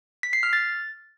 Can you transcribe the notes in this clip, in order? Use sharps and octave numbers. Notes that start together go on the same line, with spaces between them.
B6
C7
F6
A6